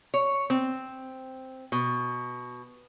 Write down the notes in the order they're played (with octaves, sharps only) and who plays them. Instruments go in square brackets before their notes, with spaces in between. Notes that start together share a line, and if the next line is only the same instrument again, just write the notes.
[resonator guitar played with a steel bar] C#5
C4
B2